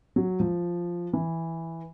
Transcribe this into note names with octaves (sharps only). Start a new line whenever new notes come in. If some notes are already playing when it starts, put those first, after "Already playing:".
F#3
F3
E3